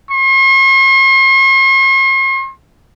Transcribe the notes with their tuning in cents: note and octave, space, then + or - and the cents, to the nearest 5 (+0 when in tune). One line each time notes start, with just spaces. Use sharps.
C6 +45